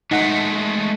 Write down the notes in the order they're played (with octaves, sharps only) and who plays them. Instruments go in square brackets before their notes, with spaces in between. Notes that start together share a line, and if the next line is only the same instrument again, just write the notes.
[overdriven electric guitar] G#3 A3 [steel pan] D#4 F#5